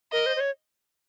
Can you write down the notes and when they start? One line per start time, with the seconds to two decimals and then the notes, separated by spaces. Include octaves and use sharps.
0.13 A#4 D#5
0.26 C5
0.36 C5
0.40 C#5